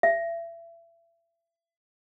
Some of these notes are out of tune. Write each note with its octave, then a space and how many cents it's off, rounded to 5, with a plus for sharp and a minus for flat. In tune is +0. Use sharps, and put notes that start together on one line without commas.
E5 +30